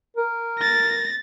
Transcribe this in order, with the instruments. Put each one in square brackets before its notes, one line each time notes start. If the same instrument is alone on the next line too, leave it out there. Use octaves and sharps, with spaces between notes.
[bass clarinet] A#4
[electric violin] A6 A#6